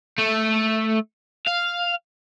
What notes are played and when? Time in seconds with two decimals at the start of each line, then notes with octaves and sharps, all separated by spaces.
0.18 A3
1.48 F5